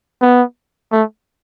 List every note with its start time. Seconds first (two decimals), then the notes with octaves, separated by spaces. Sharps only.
0.21 B3
0.92 A3